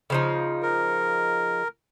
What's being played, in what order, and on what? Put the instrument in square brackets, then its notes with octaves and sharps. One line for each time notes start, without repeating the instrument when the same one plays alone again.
[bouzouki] C#3 F3 D#4
[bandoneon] A#4